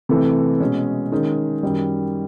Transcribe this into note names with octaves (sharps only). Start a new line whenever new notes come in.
C3 E3 A3 C4
B2 G#3 C#4
D#3 G#3 C#4
F#2 D#3 G3